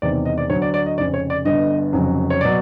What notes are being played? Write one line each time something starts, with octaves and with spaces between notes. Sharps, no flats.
E1 E2 C3 D#3 D5
D5
D#5
D5
D2 D3 F#3 C#5
D5
D5
D#5
F1 F2 C#3 D5
C#5
D5
G1 G2 D3 D#5
F1 F2 C#3 F#3
C#5
B2 F#3 D5